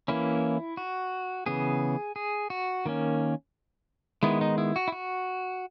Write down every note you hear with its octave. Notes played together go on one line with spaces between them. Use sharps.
E3 A#3 C#4 E4
F#4
C#3 E3 B3 G#4
G#4
F#4
D#3 A#3 C#4
D#3 G#3 B3 E4
D#4
E4
F#4
E4
F#4